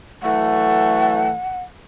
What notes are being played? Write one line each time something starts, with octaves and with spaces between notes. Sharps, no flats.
E3 F#3 A3 F#5